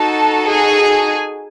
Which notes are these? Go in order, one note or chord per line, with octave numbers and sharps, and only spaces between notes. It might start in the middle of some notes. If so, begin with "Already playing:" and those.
Already playing: D#4 F#4 A4 A5
G#4 G#5